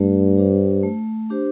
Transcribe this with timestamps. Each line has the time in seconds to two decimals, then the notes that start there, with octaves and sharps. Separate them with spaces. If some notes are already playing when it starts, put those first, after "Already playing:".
Already playing: G2 A3
0.36 D4 G4 C5
0.83 A3
1.30 D4 G4 C5